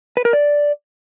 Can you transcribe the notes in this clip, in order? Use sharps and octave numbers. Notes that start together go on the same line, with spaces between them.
B4
A#4
D5